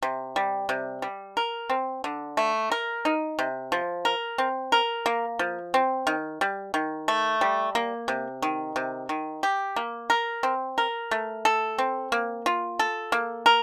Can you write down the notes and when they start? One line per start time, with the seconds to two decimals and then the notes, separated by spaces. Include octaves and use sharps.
0.03 C3
0.36 G3
0.69 C3
1.02 G3
1.37 A#4
1.70 C4
2.04 D3
2.37 A3
2.72 A#4
3.05 D#4
3.39 C3
3.72 F3
4.05 A#4
4.38 C4
4.72 A#4
5.06 A#3
5.39 F3
5.74 C4
6.07 D#3
6.41 G3
6.74 D#3
7.08 A3
7.41 G3
7.75 A#3
8.08 C3
8.42 D#3
8.76 C3
9.09 D#3
9.43 G4
9.76 A#3
10.10 A#4
10.43 C4
10.78 A#4
11.11 A3
11.45 A4
11.78 C4
12.12 A#3
12.46 F4
12.79 A4
13.12 A#3
13.46 A#4